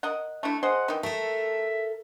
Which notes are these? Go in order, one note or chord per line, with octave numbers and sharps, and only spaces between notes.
A#4 D#5 F#5
A3 D4 E4
G#4 C5 D#5 F#5
D#3 E3
A3 A4 A#4 E5